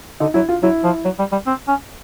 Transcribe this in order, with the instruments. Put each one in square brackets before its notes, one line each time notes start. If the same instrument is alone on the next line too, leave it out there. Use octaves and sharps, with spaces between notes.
[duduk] D3 [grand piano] D#4
[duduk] F#3 [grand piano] E4
[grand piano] F4
[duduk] F#3 [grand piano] E4
[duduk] F3
F#3
G3
G3
C4
C#4